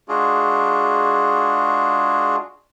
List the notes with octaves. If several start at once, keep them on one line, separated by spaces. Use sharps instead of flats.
G#3 D4 F4 F#4 G#4